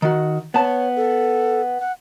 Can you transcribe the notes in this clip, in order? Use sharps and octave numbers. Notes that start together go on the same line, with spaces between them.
D#3 F#4
B3 C#5 A5
A4
F#5